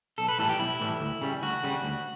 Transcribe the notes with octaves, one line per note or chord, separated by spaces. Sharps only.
B1 A4
B4
A2 E3 G3 A4
G4
B1 E4
A2 E3 G3
D2
C#3 G3
D2 F#4
C#3 G3
D2